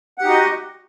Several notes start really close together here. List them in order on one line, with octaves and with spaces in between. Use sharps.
F#5 G4 D#4 F#4 D#5